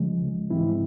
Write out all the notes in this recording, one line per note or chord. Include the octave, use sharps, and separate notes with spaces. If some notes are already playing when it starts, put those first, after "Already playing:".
Already playing: C#2 C#3 F3 G#3
G#2 E3 G#3 C4 E4